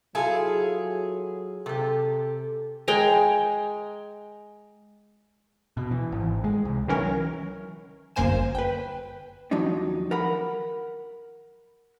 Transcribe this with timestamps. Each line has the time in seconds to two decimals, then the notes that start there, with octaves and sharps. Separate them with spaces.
0.15 F#3 E4 F4 G#4 A4
1.66 C3 G4 A4
2.88 G#3 G5 G#5 A#5
5.77 B2
5.91 E3
6.12 G#1
6.44 G#3
6.65 C2
6.88 D#3 E3 F#3 C#4 A#4
8.16 G1 F#2 A#3 C5 G#5 E7
8.55 B4 G5
9.51 D#2 F3 F#3 D4 D#4
10.11 A#4 F#5 B5